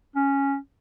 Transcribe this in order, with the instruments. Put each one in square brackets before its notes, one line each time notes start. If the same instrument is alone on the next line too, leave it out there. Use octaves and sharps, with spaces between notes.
[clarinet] C#4